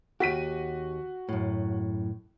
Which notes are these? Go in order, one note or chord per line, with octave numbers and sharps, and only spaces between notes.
D#2 F#4 G4 B6 D#7
F#2 A2